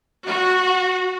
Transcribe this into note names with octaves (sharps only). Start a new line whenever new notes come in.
F#4